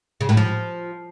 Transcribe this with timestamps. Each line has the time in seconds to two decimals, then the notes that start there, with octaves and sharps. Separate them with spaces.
0.21 C#3
0.29 A2
0.37 F3